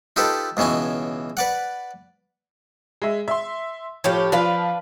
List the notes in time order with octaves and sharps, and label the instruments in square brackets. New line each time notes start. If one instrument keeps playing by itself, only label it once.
[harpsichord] D#4 F4 G4 A4 B4
C#2 B2 E3 C#4 G#5
B4 D5 F#5
[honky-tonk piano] G#3 E5
E5 C6
[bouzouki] A2 C#4 G4 [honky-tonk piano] F3
[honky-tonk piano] F3 F4 [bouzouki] D4 B4 F5